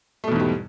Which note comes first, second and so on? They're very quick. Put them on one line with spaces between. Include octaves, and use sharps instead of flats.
A3 B2 E2 G#2 G3